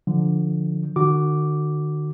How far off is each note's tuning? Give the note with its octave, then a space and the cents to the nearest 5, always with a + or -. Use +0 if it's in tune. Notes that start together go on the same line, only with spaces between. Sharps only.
D3 +0 F3 +0
D3 +45 F#4 +0 D6 -5